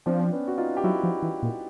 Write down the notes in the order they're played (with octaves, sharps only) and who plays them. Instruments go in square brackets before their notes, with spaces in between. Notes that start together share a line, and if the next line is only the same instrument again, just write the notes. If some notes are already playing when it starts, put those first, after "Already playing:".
[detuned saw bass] F3 [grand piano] C4 D4
[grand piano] C4
B3 C#4
F#4
D#4 F4
G4
[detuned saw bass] F#3 [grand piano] E4 F#4
[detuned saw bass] F3
E3
A#2